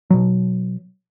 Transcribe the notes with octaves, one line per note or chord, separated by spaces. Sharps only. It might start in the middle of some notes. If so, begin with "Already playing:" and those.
B2 F#3